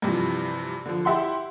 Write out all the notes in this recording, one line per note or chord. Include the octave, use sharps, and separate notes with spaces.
G2 C3 E3 F3
D3 F3
E4 G4 E5 F#5 C6